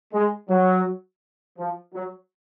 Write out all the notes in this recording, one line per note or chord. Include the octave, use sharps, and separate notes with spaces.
G#3
F#3
F3
F#3